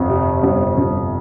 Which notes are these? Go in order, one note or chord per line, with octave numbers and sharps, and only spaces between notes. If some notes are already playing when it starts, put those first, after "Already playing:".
Already playing: G1 F2
C3
G1
G1